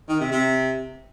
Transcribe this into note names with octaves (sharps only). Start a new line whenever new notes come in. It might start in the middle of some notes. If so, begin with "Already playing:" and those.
D#3
C3
C3